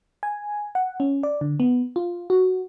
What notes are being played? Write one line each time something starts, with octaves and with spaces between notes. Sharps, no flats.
G#5
F#5
C#4
D5
D3
B3
F4
F#4